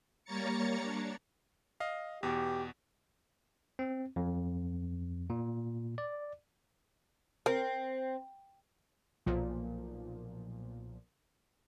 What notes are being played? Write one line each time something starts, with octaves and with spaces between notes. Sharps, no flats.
G3 A#3 C#5 A#5 A6 C#7
D4
D#5 F5
E2 B2 G4
C4
F2
A#2
D5
C4 A#4
B1 A#2 F3